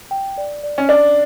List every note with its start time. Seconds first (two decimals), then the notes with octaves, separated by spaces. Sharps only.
0.11 G5
0.38 D5
0.63 D5
0.78 C#4
0.89 D4 D5